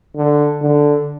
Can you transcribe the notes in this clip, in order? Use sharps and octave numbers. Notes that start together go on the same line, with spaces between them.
D3
D3